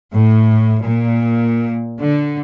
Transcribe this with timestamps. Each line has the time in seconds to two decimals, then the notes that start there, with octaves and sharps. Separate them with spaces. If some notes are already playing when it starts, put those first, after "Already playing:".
0.14 A2
0.83 A#2
2.01 D3